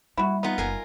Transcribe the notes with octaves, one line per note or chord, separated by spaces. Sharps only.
G3 A#3 E4 F#4
B3 D#4 F4
F#1 G3 A#4 F5 G#5